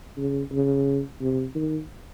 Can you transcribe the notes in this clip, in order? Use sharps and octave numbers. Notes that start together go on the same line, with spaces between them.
C#3
C#3
C3
D#3